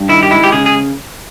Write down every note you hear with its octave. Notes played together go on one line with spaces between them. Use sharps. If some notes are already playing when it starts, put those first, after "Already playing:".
Already playing: G2
D#3 E4
G4
G#3 E4
G4
C#3 G#4
G#4